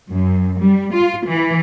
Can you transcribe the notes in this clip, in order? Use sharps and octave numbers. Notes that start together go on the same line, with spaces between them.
F#2
G3
F4
E3